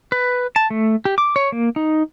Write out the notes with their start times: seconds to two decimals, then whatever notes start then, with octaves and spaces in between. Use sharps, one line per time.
0.12 B4
0.56 A5
0.70 A3
1.05 G4
1.18 D6
1.36 C#5
1.52 A#3
1.76 D#4